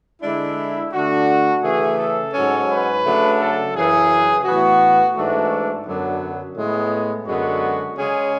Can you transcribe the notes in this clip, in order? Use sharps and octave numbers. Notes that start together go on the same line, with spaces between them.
D3 G#3 D4 E4
D3 A3 D4 F#4
C#3 E3 A3 G#4
A4
G#2 F#3 C#4
B4
C#3 F#3 A3 D4
A4
F#2 C#3 E3 G#4
A2 E3 B3 F#4
G#2 E3 A3 D4 F#4
F#2 D3 F#3 B3 D4
A2 G#3 B3
F#2 D3 G#3 B3 F#4
C#3 G#3 C#4 G#4